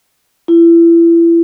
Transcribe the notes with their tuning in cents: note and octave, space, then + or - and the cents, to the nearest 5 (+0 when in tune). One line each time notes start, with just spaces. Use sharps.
E4 +30